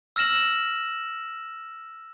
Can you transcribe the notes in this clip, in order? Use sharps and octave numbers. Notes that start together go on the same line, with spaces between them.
E6 F6 A#6 E7 F#7